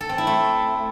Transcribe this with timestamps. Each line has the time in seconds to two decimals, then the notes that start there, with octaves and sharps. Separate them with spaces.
0.01 A4
0.09 C4
0.18 E4
0.27 A3